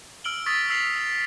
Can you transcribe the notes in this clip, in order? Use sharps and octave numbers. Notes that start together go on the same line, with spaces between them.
E6 F6 D7 F#7 G7
C#6 D#6 A6 B6
E6 B6 C7 F7 F#7